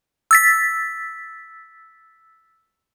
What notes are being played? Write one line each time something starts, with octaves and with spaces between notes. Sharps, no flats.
E6 A6 B6